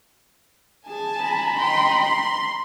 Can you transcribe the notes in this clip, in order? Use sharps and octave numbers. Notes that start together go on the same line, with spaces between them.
G#4 G#5 A5
A#5 B5
D#5 G5 C6
C6